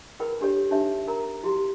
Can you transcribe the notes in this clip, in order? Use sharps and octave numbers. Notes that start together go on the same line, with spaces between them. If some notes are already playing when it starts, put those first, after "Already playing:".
E4 G#4 A#4 B4 G5 B5
D4 G4 A4 C#5
D4 D#4 G4 C#5 E5
A#4 A#5
E4 F#4 G4 C6